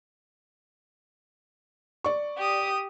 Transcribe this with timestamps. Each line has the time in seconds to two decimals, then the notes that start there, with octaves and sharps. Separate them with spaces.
2.04 D5 C#6
2.37 G4 D#6